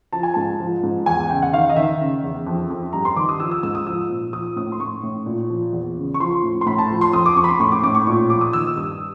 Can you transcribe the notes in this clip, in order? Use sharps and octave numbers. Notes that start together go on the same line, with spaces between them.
F3 A5
G#5
G#2 A5
F3
G#2
E2 G#5
C#3 G5
F#5
D#3 F5
D#5
D#3 E5
C#3
E2
F2
F2
G2 A#5
C6
D#3 D6
D#6
F3 E6
E6
G#2 E6
D#6
F3 E6
A#2
F3 D#6
A2 D#6
C6
A2 C#6
A2
A#2
F3
E2
C#3
C#6
F3 C6
A2
C6
A2 B5
A5
F3
C6
F2 D#6
D6
F2 C#6
B5
C6
A2 C#6
D6
A2 D6
C#6
A#2 C#6
F3 D6
D#6
D#3 E6
G2 D#6